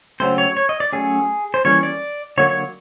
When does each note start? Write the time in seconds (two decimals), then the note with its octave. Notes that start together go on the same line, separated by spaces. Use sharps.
0.20 C#3 F#3 A3 C4 C5
0.38 C#5
0.57 C#5
0.69 D#5
0.80 D5
0.92 F#3 A3 C#4 G#4
1.54 C5
1.65 E3 G3 A#3 C#4 C#5
1.83 D5
2.37 D3 F#3 A#3 C#5
2.49 C#5